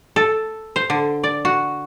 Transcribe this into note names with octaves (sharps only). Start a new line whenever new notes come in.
A4
C5
D3
D5
F#4